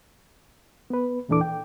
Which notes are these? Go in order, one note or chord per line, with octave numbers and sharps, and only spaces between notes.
B3 B4
E2 A#2 E3 D4 A4 D6
G5